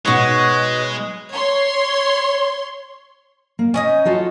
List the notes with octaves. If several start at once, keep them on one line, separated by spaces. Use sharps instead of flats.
G#2 B2 G#3 F#4 B4 C#5 D#5
C#5 C6
A#3
C#4 D#4 D#5 G#5
F4 F#4 A4